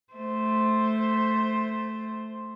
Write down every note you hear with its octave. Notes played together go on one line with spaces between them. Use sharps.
A3 C5